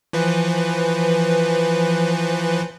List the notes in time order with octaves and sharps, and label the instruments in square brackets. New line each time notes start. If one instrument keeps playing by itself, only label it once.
[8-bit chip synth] E3 F3 B4